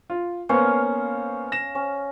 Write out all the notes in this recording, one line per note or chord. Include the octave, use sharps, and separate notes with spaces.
F4
A#3 B3 C#4 C5 F5 C#6
A#6 E7
C#4